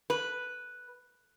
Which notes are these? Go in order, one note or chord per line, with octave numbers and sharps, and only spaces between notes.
B4